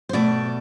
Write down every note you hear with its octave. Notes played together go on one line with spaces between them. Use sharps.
C5
B2 A3 D5